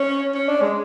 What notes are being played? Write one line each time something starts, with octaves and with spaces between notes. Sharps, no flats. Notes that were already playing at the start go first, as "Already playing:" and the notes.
Already playing: C#4
C#4
D4
G#3